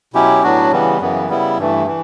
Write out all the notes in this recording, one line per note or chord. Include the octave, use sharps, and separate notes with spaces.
B2 F#3 C#4 E4 G4
A2 F#3 B3 D4 F#4
C#3 E3 G3 B3
F#2 C#3 E3 B3
C#3 G3 B3 E4
G2 E3 A3
E3